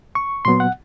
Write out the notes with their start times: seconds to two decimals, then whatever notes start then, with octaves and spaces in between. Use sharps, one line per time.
0.15 C#6
0.45 A#2 F#3 B3 C6
0.60 F#5